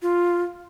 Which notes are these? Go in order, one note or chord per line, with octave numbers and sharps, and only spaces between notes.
F4